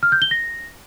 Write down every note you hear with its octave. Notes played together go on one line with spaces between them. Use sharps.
F6
G6
G7
A#6